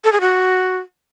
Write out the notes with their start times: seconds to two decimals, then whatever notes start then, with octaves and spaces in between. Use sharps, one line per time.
0.04 A4
0.12 G#4
0.21 F#4